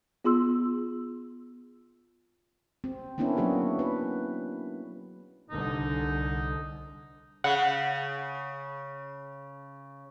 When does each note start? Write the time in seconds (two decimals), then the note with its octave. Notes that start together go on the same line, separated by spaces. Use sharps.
0.25 B3 F4 G#4 C6 E6
2.84 C4
3.18 A#3 B3 C#4 D4 E4
3.37 F#3 A#3 F#4 G#4
3.79 B4
5.50 C2 D3 D#4
7.44 C#3 F#5